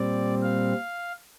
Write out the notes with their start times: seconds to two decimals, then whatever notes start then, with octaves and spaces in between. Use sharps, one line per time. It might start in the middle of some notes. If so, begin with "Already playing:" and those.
Already playing: A#2 G3 C4 D5
0.42 F5